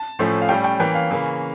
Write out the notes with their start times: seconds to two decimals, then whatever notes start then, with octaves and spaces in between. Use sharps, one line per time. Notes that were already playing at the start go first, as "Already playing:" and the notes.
Already playing: A5
0.19 A2 F3 A3 C#4
0.41 F5
0.49 A2 G3 C#4 G5
0.64 G5
0.79 E3 A#3 C#4 G5
0.95 F5
1.10 C#3 E3 A#3 C#4